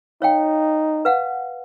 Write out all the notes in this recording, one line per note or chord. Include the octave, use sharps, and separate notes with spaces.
D#4 C#5 F5 G5
B4 F5 F#5